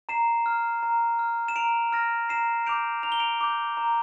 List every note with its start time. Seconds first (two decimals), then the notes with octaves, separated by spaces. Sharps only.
0.09 A#5 C7 E7
0.46 F6
0.83 A#5
1.19 F6
1.48 E7
1.56 A#5 D7 F7
1.92 F6 A#6 D7
2.29 A#5 C7 E7
2.66 D6 G6 D7 F7
3.03 A#5 F7
3.12 G7
3.20 D7 F7
3.41 D6 G6
3.77 A#5